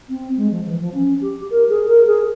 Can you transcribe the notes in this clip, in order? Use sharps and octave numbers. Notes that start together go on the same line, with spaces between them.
C4
G#3
F3
E3
F3
C#4
G4
A#4
G#4
A#4
G#4